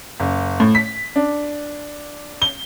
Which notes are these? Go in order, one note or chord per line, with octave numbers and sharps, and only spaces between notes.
F#1
A2
B6
D4
G7